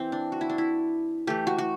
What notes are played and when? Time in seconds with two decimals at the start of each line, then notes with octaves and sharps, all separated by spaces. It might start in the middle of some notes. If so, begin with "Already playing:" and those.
Already playing: E3 C4
0.12 D4
0.32 F#4
0.41 E4
0.50 D4
0.58 E4
1.27 E3 A3 G4
1.47 F#4
1.58 F#4